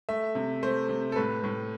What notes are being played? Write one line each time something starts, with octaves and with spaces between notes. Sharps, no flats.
A3 E5
C3
A3 C5
C3
A4
A2 B4
A2